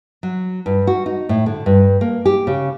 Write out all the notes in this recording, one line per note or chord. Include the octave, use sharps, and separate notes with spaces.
F#3
G2
F#4
D#4
A2
D3
G2
A#3
G4
C#3